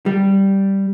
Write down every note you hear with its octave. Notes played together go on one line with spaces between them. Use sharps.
G3